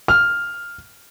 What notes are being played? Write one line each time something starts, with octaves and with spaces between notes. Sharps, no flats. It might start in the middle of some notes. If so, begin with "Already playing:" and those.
F6